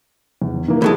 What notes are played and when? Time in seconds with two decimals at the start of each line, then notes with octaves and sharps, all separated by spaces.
0.42 E2
0.68 E3 A#3
0.82 A2 F#3 G#3 A4 A5